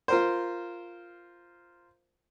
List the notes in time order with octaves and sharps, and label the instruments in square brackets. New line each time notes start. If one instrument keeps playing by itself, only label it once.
[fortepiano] F4 A#4 C5